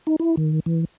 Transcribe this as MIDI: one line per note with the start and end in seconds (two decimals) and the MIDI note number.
0.07 0.16 63
0.20 0.36 64
0.37 0.60 51
0.66 0.85 52